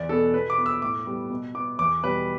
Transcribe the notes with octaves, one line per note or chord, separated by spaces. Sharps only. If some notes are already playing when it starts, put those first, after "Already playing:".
Already playing: E2 D5
B2 B3 A4
B2 B4
D6
B3
E6
A2 D6
G3 B3
B2
B3 D6
E2 D6
B2 G3 B4